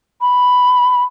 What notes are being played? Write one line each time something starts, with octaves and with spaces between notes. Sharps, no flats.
B5